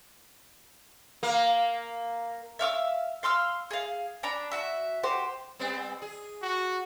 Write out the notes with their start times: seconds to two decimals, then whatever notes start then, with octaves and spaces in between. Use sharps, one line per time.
1.23 A#3
2.59 E5 F5 D6 E6
3.23 F5 C6 E6 F6
3.71 G#4 F5
4.23 D4 A#5 B5
4.51 F#4 E5
5.03 F#4 G4 C5
5.59 G3 B3 C4
6.02 G#4
6.43 F#4